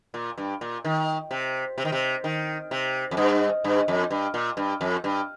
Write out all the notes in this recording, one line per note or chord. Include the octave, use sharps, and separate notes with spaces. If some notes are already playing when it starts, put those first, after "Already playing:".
A#2
G2
A#2
D#3
C3
C3
D#3
C3
D#3
C3
F2
G2
G2
F2
G2
A#2
G2
F2
G2